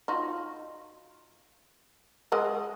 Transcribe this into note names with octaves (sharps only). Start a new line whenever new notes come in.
D#4 F4 F#4
G#3 D#5 F#5